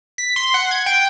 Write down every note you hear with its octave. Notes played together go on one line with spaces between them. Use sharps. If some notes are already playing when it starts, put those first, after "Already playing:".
B6
C6
F#5
G#6
G5